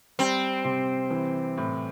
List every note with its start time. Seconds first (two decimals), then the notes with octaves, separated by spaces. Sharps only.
0.19 G3 C4
0.64 C3
1.10 E3
1.58 A2